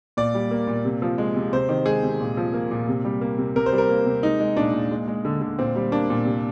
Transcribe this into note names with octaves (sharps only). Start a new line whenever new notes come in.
A#2 D5
G3
A#3
A#2
C3
F3
G#3
C3
C3 C5
D#3
G#3 G#4
C3
A#2
F3
A#3
A#2
C3
G3
A#3
C3
C3 A#4
C5
G3
A#4
A#3
C3
G#3 D#4
G#3
A#2 D4
A#2
G#3
G#3
D3
D3
A#2 C4
G3
A#3 D4
A#2
C3